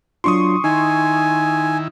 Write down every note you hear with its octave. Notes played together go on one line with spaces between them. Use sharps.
F#3 D4 F4 C6 C#6 D#6
D#3 D#4 E4 G#5